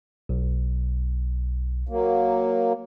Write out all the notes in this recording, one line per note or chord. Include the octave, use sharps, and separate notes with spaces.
B1
F#3 A#3